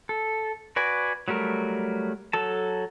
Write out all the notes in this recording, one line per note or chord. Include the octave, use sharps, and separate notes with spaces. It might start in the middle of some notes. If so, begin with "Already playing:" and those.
A4
F#4 B4 D5 G#5
F#3 G3 A3 A#4
F#3 A4 A5